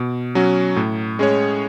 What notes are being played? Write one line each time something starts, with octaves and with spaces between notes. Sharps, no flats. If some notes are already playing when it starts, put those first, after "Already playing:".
Already playing: B2
F#3 C#4 F#4
A2
G#3 C#4 G#4 C#5